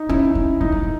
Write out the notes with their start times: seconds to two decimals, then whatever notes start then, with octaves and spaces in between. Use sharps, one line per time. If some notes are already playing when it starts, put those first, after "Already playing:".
Already playing: D#4
0.09 C#4 E4
0.35 C#4
0.60 G#3 D#4
0.72 A#3
0.83 G#3